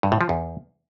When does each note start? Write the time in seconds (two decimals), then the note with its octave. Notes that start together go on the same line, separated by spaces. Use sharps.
0.03 G2
0.12 A2
0.21 F3
0.29 E2